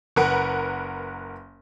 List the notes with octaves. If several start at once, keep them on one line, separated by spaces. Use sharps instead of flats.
F#1 A#4 B4 F#5